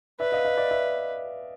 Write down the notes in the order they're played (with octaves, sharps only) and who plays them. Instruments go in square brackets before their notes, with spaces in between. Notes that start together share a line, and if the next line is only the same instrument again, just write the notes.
[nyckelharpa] B4 [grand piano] D5 E5
[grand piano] D#5 F5
D#5 F5
D5 E5
D5 E5